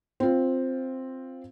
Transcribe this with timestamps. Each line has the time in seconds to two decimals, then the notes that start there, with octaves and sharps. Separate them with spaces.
0.20 C4 F4